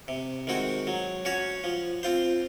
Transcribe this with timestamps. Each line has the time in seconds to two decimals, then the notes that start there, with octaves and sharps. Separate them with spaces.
0.08 C3
0.47 D#3 G#3 C4 F#4
0.87 F#3
1.25 C#4 F#4 C#5
1.64 F3
2.03 C4 F4 C5